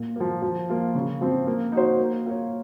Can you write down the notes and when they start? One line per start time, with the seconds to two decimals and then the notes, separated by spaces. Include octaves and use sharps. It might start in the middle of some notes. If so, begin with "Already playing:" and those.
Already playing: A#2
0.16 F3 A#3
0.42 F3
0.69 A#3 F4
0.95 C#3
1.21 F3 C4
1.47 A#3
1.72 D#4 F#4 C5
1.99 A#3
2.25 F4 A#4 C#5